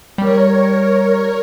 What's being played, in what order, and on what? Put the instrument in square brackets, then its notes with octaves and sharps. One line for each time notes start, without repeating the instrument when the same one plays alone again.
[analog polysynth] G3 [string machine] A#4 C#5